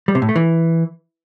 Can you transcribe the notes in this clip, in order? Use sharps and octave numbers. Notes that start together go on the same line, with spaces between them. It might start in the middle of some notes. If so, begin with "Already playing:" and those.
G3
C3
A2
A3
E3